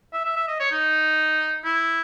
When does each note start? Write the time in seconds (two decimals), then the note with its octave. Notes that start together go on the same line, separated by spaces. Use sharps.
0.13 E5
0.25 E5
0.37 E5
0.48 D#5
0.60 C#5
0.72 D#4
1.65 E4